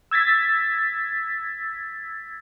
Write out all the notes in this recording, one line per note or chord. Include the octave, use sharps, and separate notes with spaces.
E6 G#6 A6 B6